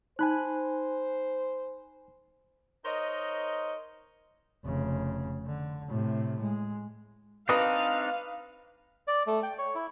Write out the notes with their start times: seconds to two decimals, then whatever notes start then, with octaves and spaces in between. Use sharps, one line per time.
0.19 D#4 C5 G#5 B5 F#6
2.85 D#4 A#4 C5 C#5 D#5
4.65 F1 C#3
5.46 D3
5.88 A2 C3
6.40 G#3
7.49 C4 D4 D#4 B4 F5 D#6
9.08 D5
9.27 A3
9.43 G5
9.58 C#5
9.75 E4